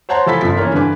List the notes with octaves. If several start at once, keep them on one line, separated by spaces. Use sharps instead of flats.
C5 C#5 F#5 A5 A#5 C6
E3 F3 A4 A5 B5 B6
G1 F3 B6
E3 A#3 C#4 A#4
G2 D3 E3 B4 G#5 D6